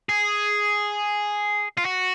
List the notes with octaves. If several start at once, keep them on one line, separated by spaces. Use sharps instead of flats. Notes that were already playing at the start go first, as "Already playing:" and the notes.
G#4
F4
F#4